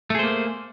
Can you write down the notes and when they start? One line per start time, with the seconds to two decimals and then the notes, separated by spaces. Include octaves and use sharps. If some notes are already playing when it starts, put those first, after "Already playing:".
0.10 A3
0.15 G#4
0.19 C5
0.23 A#3